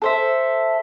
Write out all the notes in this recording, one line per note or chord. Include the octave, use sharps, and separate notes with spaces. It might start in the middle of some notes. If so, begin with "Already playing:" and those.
A4 C5 E5